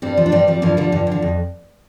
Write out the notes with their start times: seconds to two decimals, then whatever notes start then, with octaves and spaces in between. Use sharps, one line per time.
0.02 G2 G3 C4
0.17 F3
0.26 D4
0.32 G2 G3 C4
0.47 F3 G3 C4
0.62 G2 F3 A#3
0.77 D3 F3 G3
0.92 G2 F3
1.07 D3 F3
1.22 F2